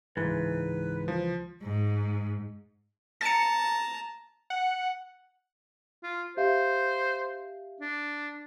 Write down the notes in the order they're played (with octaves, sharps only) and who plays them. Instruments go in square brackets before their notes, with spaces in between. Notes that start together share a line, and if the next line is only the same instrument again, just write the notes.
[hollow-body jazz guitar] C#2 E3 [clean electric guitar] G#2 [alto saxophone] B4
[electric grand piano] F3
[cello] G#2
[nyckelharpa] A5 A#5 [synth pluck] A6 C#7
[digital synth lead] F#5
[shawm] F4
[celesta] G4 E5 F5 [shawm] C5
[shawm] D4